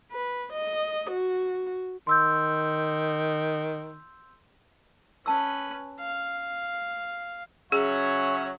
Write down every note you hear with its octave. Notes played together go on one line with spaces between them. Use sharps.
B4
D#5
F#4
D#3 C6 E6 G6
C#4 B4 A5 E6
F5
C#3 F#3 C#4 G#4 C#5 E5 F#5